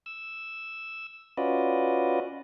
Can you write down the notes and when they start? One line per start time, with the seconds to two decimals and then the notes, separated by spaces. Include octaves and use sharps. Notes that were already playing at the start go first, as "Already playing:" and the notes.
0.06 E6
1.37 C#4 F4 F#4 B4 D5 D#5